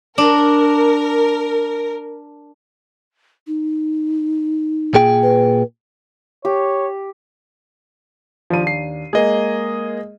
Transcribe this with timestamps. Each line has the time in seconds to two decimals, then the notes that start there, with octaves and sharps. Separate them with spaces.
0.18 D4 A#4
3.47 D#4
4.94 A#2 G#4 G5
5.23 B4
6.45 G4 C#5
8.50 D#2 F3 D4 D#7
8.67 C7
9.13 G#3 A#3 G#4 D#5